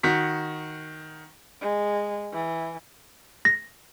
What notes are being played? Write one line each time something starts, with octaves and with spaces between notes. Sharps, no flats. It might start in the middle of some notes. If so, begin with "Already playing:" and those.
D#3 F#4 B6
G#3
E3
A#6